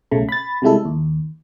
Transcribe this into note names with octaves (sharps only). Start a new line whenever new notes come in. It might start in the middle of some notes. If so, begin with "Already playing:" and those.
B1 C#3 A3
B5 A6
C3 G3 G#3 E4 A4
D#2